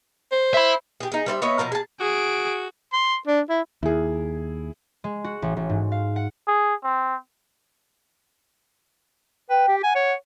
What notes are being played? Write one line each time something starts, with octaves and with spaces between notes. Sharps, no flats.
C5
E5 B5
G4 G#4
D#4 G#4
G3 C5 D5 E5
B3 C#5 D#5 E5
B2 F3 A#4 A#5
G#4 A5
F#4 G#4 D7
C6
D4
E4
D#2 E4 G#4
G#3
F#4
A1
A1
G#2
F5
F#5
G#4
C4
B4 G5
G4
F#5 G#5
C#5